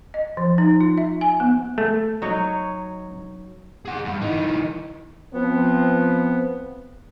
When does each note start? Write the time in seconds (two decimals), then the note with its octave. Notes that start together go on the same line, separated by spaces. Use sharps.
0.14 D#5
0.37 F3
0.58 D#4
0.81 F4
0.98 E5
1.21 G#5
1.40 B3
1.78 A3
2.22 F#3 D#4 C#5
3.85 G#4 F#5
4.05 G2
4.21 E3 D#4
5.33 F3 B3 C4